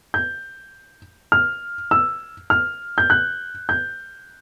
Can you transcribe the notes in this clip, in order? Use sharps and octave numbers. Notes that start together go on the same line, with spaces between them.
G6
F6
E6
F6
G6
F#6
G6